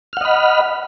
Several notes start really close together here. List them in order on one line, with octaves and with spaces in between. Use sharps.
F6 F#5 D#5 B5